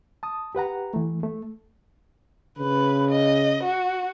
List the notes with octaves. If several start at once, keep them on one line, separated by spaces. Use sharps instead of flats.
A5 D#6
G4 B4 F#5 A#5
E3 A3
A3
C#3 B4
D#5
F#4